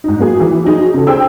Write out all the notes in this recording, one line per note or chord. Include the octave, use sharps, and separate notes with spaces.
G#2 D#4
F#3 A#3 G#4
E3
F3 F#3 D#4 G#4
C#3 A4
G#4 C5 G5 E6